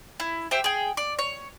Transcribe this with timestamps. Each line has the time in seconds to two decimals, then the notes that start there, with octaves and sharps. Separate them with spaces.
0.20 E4
0.51 G4 C5 E5 G5
0.64 G#4 G5
0.97 D5
1.19 C#5